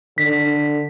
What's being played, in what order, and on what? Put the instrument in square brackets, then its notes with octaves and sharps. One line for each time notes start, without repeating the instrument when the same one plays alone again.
[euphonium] D3 [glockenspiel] B6